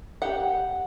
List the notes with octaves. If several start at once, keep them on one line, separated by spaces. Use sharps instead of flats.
G4 F#5